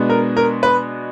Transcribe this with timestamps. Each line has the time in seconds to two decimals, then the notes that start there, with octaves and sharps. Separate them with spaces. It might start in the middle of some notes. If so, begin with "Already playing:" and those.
Already playing: B2 G#3 B3 D4
0.10 A#4
0.37 A#4
0.63 B4